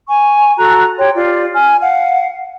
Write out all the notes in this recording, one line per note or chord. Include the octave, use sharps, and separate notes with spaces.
G#5 C#6
F#4 A4 A#5 F#6
G4 C#5 G5 C6
F4 G4 D5
G#5 F6
F5 F#5